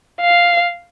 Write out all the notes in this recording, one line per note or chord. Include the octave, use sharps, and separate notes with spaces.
F5